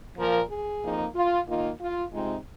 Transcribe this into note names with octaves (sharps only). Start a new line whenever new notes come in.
A#2 F3 A#3 A#4
G#4
F2 F3 A#3 D#4
F4
D#3 A#3 D#4 F4
F4
C3 G#3 C4 D#4 F4